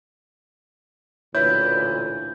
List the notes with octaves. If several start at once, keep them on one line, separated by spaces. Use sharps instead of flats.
A1 D2 A#2 E4 B4 C#5 G6